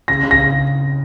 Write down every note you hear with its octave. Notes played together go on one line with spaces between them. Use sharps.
C#3 A#6
C#3
A#6
C#3